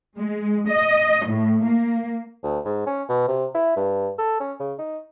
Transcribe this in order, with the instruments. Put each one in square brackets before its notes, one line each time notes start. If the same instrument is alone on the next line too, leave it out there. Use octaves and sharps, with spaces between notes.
[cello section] G#3
D#5
A2
A#3
[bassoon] D2
G#2
C#4
B2
C3
E4
G2
A4
C#4
C#3
D#4